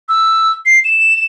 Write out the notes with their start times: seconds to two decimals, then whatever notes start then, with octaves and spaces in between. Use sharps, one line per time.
0.09 E6
0.66 C7
0.85 E7